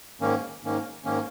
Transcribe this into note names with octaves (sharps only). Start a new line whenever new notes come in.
G#2 D#3 A#3 C#4
G#2 D#3 A#3 C#4
G#2 D#3 A#3 C#4